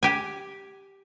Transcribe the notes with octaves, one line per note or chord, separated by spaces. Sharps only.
G4 G#5